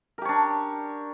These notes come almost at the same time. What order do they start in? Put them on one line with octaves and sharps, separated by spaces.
A#4 G4 C#5 D4